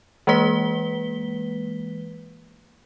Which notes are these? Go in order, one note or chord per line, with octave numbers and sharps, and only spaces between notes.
E3 G#3 A#3 B4 B6 G7